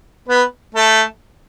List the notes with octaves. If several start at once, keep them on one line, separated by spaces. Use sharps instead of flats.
B3 B4
A3 A4